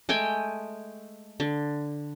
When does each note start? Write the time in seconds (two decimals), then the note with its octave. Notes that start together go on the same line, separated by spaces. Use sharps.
0.09 G#3 A3 G5 G#5
1.40 D3